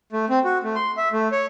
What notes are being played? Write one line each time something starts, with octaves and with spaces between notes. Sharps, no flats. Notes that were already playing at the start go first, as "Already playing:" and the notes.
A3
C4
F#4
A3
C6
E5
A3
C#5